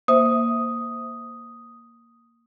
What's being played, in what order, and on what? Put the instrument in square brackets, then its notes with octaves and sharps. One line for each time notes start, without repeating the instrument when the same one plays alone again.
[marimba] A#3 C5 E5 [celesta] D#6